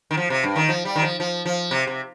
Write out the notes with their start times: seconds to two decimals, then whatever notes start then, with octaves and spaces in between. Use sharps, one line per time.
0.11 D#3
0.17 F3
0.30 C3
0.44 G2
0.56 D#3
0.69 F3
0.85 G3
0.95 D#3
1.02 F3
1.20 F3
1.45 F3
1.71 C3
1.87 C3